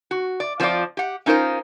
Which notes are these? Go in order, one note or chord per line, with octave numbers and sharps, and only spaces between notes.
F#4
D5
F3 A#3 C4 D4 F4 D5
G4 F#5
C#4 D#4 F4 A#4 C5